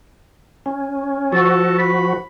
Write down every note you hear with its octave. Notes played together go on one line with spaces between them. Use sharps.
C#4
F3 F#4 A4
B5